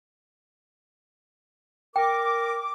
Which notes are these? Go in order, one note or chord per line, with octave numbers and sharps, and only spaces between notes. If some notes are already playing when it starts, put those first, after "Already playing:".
A#4 G5 D6